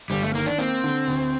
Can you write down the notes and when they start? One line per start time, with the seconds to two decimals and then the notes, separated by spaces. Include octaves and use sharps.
0.10 G1 G3
0.23 A3
0.35 D#3 A#3
0.46 D4
0.58 A#3 C4
0.84 D3
1.08 D2